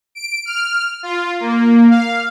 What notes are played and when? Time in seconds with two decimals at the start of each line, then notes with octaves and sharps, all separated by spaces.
0.15 D7
0.46 F6
1.03 F4
1.40 A#3
1.91 F5